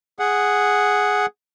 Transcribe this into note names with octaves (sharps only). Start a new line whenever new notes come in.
G#4 F#5